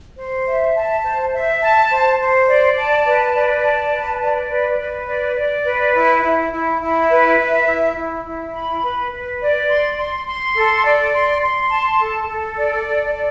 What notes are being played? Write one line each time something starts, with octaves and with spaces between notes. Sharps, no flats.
C5
E5
A5
C5
E5
A5
C5
C5
D5
A5
B4
D5
A5
B4
D5
B4
B4
D5
D5
B4
E4
E4
E4
E4
B4
E5
E4
E4
E4
B5
B4
B4
D5
C6
C6
C6
A4
D5
C6
C6
A5
A4
A4
D5
A4
D5